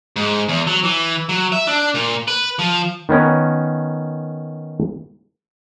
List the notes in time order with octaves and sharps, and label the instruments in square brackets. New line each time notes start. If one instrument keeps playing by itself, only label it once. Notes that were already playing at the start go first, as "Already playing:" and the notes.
[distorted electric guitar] G#2
E2
F#3
E3
F#3
E5
D4
A#2
B4
F3
[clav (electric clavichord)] D#3 B3 C#4 A#4